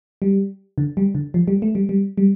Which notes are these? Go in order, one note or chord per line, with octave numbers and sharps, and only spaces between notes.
G3
D3
G3
D3
F3
G3
A3
G3
G3
G3